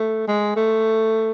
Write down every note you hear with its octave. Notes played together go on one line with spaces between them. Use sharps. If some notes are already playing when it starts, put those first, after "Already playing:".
Already playing: A3
G#3
A3